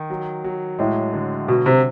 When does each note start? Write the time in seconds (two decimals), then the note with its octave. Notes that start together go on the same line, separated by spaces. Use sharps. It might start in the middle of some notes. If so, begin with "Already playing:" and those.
Already playing: D#3
0.10 F#3
0.44 F#3
0.79 A2 G#3
1.13 D3
1.48 B2 F#3
1.66 C3